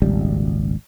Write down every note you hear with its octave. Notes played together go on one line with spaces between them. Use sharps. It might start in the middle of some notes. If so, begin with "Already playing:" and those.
D#1 G#1 C#2 G3